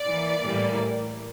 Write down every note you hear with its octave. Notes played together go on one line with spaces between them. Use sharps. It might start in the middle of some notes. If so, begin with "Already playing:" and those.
Already playing: D5
E3 A#3
A2 E3 G3 A#3